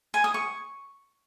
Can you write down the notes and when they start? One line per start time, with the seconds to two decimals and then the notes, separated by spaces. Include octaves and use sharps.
0.14 G#5
0.24 D#6
0.34 C#6